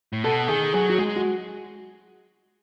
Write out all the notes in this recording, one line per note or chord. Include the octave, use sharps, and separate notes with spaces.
A2
B2 A4
D#3 G#4
F#3 G#4
F#4
G#3 G#4
F#4